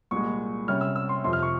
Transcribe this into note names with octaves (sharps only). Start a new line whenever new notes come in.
C2 A#2 G#3 C#6
C3 G3 C#4 F6
E6
E6
C6
F2 C3 F3 C6
F6
C#6